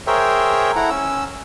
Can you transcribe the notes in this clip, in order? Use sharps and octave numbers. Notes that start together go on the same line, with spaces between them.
G#4 A#4 C5 C#5 E5 G5
E4 A4 F#5 A#5
C#4 E6